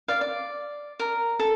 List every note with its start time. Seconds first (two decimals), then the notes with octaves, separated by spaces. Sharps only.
0.08 D5 F5
0.21 D5
1.00 A#4
1.39 A4